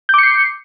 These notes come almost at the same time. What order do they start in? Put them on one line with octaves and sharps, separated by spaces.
G6 D6 C#7 C7